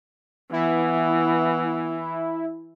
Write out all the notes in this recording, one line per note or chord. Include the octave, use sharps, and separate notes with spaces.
E3 B3 E4